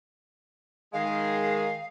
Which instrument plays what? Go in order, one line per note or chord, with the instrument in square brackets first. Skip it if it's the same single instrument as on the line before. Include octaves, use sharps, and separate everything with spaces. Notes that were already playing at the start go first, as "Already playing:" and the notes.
[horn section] D#3 G#3 G#4 [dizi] F5